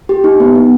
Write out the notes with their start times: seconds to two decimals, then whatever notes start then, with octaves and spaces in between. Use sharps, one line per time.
0.09 G4
0.24 D#4
0.40 B3
0.55 B3